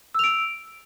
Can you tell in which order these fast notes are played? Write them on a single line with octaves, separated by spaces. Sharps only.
E6 F7 D7